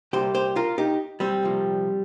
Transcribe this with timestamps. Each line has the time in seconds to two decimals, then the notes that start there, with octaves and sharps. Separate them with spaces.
0.13 C2 A#2 G3 G4 C5
0.35 G4 C5
0.56 F4 A#4
0.78 D#4 G4
1.20 G3 C4
1.43 C2 A#2 F3